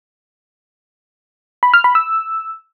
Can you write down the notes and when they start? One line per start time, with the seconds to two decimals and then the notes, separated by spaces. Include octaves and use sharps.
1.63 B5
1.74 F6
1.84 B5
1.95 E6